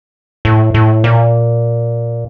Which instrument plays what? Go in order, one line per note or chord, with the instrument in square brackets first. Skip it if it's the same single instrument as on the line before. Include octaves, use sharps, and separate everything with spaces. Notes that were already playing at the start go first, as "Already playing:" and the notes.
[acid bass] A2
A2
A#2